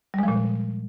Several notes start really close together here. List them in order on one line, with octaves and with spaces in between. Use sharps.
G3 G#3 F3 A#2